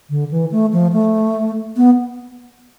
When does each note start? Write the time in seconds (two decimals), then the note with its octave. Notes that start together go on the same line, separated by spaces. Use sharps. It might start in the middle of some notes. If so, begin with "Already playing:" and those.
0.10 D3
0.31 E3
0.52 A3
0.73 F3
0.93 A3
1.77 B3